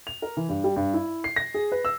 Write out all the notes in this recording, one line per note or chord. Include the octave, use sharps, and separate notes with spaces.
F7
A#4
E3
G2
G3
G2
E4
C7
A#6
G#4
B4
E6